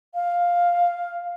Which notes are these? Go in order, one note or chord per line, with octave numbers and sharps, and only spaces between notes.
F5